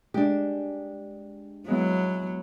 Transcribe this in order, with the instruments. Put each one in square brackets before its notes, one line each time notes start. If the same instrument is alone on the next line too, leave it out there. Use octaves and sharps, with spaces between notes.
[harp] G#3 [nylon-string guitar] D4 G4
[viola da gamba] F#3 [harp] G#3 B3 E4